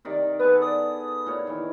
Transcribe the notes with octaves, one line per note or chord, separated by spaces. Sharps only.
C3 D#3 D5
B3 G#4 A4 B4
D5 D#6
A#2 C#5
D#3 E3